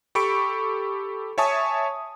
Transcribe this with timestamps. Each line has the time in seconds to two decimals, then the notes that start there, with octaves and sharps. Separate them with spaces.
0.15 G4 A4 B5 C#6 D7
1.38 C#5 E5 G#5 A5 C#6 D#6